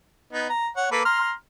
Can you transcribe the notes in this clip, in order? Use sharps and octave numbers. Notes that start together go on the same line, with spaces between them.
B3 D#4
A#5
C#5 F#5
A#3 A4 B4
A#5 C6 F6